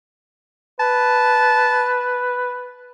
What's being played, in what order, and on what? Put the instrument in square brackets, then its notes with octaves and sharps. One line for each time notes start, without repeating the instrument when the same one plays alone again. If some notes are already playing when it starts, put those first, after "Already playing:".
[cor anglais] B4 [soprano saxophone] A5